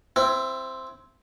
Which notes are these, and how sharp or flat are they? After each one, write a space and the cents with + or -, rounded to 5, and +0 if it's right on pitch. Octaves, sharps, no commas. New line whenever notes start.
C4 +0 E4 +25